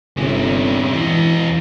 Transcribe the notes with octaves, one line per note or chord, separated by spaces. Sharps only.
G1 C3 C#4
E2 E3 D#5